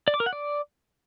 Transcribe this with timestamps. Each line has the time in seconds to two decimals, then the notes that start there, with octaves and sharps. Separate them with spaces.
0.08 D5
0.14 D6
0.20 A#4
0.26 F#5
0.33 D5